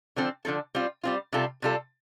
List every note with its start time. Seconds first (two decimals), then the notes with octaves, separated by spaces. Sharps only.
0.16 D3 F3 C4 A4
0.45 D3 F3 C4 A4
0.75 G3 C4 F4
1.03 G3 C4 F4
1.32 C3 G3 F4 A4
1.62 C3 G3 F4 A4